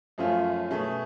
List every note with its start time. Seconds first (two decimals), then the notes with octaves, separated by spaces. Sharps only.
0.18 F#2 F3 A3 C#4 F4
0.70 B2 A3 C#4 G#4